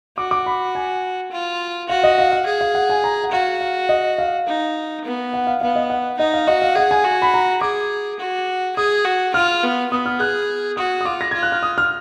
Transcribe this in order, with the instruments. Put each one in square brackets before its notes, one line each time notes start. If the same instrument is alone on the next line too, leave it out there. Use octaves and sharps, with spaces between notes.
[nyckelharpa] F#4 [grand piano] D6
[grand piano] D6
B5
G#5
[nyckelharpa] F4
[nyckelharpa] F#4 [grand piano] F5
[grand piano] D#5
F5
F5
[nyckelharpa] G#4
[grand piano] F5
F#5
G#5
A#5
F#5
[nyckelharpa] F#4 [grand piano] F5
[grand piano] F5
D#5
F5
[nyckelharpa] D#4
B3
[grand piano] F#5
F5
[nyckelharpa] B3 [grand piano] F5
[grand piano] D#5
F#5
[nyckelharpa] D#4 [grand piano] D#5
[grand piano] F5
[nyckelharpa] F#4 [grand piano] D#5
[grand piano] F5
[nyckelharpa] G#4 [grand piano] F#5
[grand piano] G#5
[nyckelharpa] F#4
[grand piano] B5
A#5
[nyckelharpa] G#4 [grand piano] D6
[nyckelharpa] F#4
[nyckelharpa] G#4 [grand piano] D#6
[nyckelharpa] F#4
[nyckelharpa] F4 [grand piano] F6
[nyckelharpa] B3
[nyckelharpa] B3 [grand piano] D#6
[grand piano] F6
[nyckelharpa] G#4 [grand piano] F#6
[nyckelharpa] F#4 [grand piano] D#6
[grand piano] D#6
[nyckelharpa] F4 [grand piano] D6
[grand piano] A#6
[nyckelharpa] F4 [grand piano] G#6
[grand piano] F#6
F6
D#6
F6